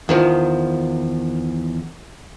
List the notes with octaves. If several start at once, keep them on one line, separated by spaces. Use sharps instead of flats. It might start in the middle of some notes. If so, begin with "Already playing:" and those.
E2 D#3 F3